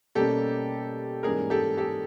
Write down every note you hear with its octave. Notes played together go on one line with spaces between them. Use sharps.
B2 G3 A#3 C#4 G4 A4
G#2 E3 G3 A#3 C#4 G#4 A#4
G4 A4
G4 A4